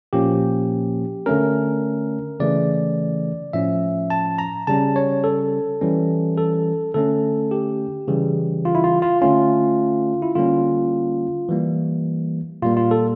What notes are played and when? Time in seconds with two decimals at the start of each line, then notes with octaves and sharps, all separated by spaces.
0.13 A#2 F3 A#3 C#4 G4
1.26 D3 A3 C#4 A#4
2.40 C#3 E3 A3 C#4 D5
3.53 A2 F3 C#4 E5
4.10 A5
4.38 A#5
4.67 C#3 G3 C#4 A5
4.96 C#5
5.24 A4
5.81 E3 G3 C#4
6.38 A4
6.94 D3 A3 C#4 A4
7.51 G4
8.08 C#3 E3 G3
8.65 F4
8.75 E4
8.84 F4
9.02 F4
9.22 D3 A3 C#4 F4
10.22 E4
10.35 D3 G3 A#3 C#4 F4
11.49 E3 G3 A#3
12.62 A#2 G3 A#3 F4
12.77 F4
12.91 A4